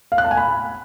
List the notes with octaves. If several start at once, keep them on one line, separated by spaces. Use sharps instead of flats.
F5
F#6
A5
G#5
B5